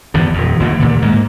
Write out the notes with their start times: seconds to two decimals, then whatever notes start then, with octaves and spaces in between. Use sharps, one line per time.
0.14 G1 E2 D3
0.34 D#1 F2
0.59 F1 D#2 A2 D3
0.80 D#2 A#2 D3
1.02 G#2 A#3